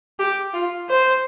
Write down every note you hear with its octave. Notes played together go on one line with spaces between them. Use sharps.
G4
F4
C5